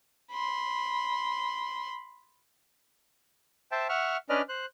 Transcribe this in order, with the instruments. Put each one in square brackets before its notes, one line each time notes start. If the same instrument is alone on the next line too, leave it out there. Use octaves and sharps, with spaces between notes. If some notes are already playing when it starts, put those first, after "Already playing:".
[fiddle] B5 C6
[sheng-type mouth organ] C5 E5 G5 A5
E5 F#5 C#6 F6
C#4 D4 B4 D5 D#5 F6
C5 F#6